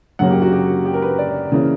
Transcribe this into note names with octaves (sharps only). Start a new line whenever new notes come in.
F#2 C#3 F#3 A#3 F#5
G4
F#4
G4
G4
A#4
B4
D5
C#3 E3 A#3